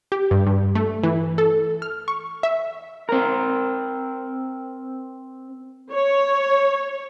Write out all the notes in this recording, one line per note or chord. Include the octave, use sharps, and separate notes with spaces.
G4
G2
G2
A3
E3
A4
F6
C#6
E5
C4 A#4
C#5